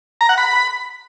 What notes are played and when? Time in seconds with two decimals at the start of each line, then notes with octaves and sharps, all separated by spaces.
0.21 A#5
0.29 F#5
0.38 B5